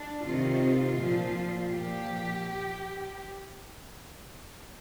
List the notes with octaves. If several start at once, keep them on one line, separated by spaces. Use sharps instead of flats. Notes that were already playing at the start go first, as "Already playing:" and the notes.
Already playing: D4
C3 D#3 F4
A#2 F3
A#2 F3 G4